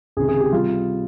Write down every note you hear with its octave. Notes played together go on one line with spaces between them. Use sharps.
C#2 C3 D#3 G#4
G#4
G4
C3 G3 F4